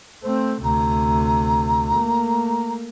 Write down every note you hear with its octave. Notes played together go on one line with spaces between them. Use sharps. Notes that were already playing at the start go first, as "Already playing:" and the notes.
A3 C4 C5
D2 C3 A#5
A3 A#3